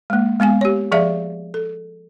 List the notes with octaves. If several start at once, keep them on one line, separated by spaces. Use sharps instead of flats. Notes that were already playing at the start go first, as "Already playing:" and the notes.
G#3 A#3
G#3 B3 F5 G#5
G4 C#5
F3 G#4 D5 E5 F5
A4